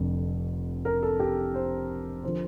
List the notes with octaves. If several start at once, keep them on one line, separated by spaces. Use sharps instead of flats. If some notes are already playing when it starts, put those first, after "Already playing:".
Already playing: F1 F2 D3
A#4
A4
G4
C5
D3 F3 C5